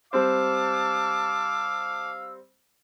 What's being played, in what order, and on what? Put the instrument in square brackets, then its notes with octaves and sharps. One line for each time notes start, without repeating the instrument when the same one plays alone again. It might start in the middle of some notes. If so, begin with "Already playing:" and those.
[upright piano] G3 C4 C5 [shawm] F5 [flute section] A5 D6 [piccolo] E6